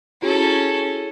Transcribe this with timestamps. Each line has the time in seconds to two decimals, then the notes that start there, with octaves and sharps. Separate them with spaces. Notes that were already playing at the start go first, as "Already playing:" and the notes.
0.22 C#4 E4 F#4 G#4 A4